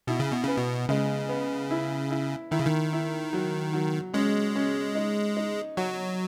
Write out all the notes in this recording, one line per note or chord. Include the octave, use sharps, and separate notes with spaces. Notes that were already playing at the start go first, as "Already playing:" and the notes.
B2 E4
C#3
B2
C#3 B3
B2
C#3 G#3
B3
E4
E4
D#3 E4
C#3
D#3
E4
F#3
F#3
G#3 C#4
C#4
D#4
D#4
F#3 F#4